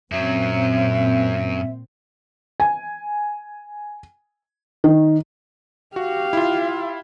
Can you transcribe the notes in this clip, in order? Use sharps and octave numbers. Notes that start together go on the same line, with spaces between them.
F#2 A#2 F#3 C4 E5
G#5
D#3
F#4 G4 F5
E4 F4